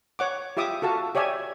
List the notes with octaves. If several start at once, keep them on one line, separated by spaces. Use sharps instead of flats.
C#5 F#5 D6
F4 G4 E5 D6 D#6
F#4 A4 F5 A5
G4 C#5 D5 E5 G#5